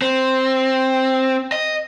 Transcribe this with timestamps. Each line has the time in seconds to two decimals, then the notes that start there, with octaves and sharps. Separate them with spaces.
0.02 C4
1.52 D#5